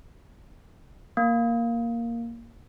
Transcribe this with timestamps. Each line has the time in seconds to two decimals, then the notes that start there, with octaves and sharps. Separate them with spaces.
1.17 A#3